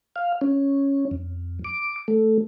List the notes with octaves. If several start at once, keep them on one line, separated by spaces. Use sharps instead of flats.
F5
C#4
F2
D6
A3